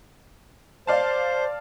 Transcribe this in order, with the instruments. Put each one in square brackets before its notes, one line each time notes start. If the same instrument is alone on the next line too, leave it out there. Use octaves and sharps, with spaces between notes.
[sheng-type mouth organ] C5 [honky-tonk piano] D5 F5 A5